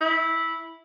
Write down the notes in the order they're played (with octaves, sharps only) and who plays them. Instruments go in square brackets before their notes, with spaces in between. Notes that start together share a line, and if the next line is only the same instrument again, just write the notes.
[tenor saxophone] E4